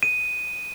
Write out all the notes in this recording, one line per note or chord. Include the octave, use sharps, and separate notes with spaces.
D#7